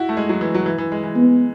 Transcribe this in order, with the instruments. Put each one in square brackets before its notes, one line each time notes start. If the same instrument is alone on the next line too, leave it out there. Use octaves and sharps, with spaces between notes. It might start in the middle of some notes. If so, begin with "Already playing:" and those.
Already playing: [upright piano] E4 F#4
A3
G#3
F#3
E3
F#3
E3
E3
G#3
E3
[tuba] B3